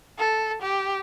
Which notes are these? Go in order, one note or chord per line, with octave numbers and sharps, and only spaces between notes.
A4
G4